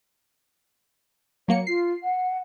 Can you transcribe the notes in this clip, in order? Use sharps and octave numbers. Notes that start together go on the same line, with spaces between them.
F#3 A#3 C#5 C#7
F4 C7
F#5